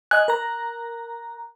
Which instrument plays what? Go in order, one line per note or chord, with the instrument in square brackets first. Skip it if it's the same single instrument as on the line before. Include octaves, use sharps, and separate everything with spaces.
[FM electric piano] D#5 G#5 [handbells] F#6
[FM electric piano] A#4 A#5